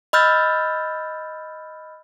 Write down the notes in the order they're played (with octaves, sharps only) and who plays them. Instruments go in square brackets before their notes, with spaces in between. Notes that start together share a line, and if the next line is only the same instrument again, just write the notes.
[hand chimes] D#5 B5 E6 F6 G6 A6